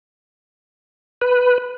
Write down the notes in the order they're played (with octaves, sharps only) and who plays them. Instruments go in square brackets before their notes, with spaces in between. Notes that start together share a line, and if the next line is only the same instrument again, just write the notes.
[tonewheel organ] B4